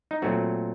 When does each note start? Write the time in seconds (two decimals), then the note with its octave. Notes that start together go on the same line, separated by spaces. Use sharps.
0.11 D#4
0.22 A#2 F#3 A3 C4 F#4